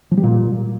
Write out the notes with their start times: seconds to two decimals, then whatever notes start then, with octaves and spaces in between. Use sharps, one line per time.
0.11 F3
0.17 G3
0.23 A#2